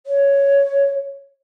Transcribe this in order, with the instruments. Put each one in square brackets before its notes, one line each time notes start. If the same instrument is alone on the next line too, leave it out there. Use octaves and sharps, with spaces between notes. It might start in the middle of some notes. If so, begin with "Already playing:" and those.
[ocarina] C#5